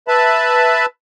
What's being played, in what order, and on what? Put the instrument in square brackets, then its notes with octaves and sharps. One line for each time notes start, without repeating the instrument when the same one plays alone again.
[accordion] B4 E5 A5 B5